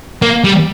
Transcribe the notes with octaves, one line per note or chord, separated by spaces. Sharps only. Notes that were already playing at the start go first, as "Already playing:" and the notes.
A#3
G3